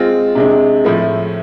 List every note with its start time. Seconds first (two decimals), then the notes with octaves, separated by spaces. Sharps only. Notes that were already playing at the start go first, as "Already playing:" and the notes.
Already playing: G#3 C4 F4
0.35 C3 G#3 D4
0.84 A2 F3 A3 E4